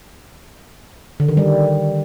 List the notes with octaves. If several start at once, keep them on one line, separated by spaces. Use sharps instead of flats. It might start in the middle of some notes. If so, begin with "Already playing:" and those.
D3
D#3
G3